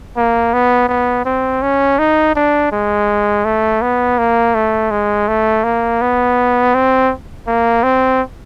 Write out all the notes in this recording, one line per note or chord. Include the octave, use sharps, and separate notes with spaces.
A#3
B3
B3
C4
C#4
D#4
D4
G#3
A3
B3
A#3
A3
G#3
A3
A#3
B3
C4
A#3
C4